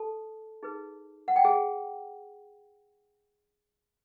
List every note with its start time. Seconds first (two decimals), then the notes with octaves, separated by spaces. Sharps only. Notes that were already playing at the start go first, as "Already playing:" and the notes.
Already playing: A4 A5
0.63 D#4 G#4 B4
1.28 F#5
1.36 G5
1.45 G#4 G#5